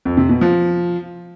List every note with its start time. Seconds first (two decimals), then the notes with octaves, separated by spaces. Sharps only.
0.05 F2
0.17 C3
0.29 B2
0.41 F3